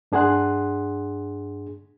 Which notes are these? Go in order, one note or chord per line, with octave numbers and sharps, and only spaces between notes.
G2 D4 G#4 F#5 C6 F#6